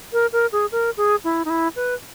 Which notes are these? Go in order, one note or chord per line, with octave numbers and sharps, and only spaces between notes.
A#4
A#4
G#4
A#4
G#4
E4
D#4
E4
B4